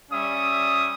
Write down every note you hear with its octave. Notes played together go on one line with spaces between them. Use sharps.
G3 C#4 E5 D#6